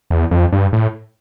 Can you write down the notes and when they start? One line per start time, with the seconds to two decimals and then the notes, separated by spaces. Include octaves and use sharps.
0.10 E2
0.31 F2
0.52 G2
0.73 A2